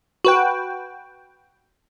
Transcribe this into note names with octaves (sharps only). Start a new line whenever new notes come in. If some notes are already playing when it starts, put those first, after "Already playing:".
F#4 B4 G5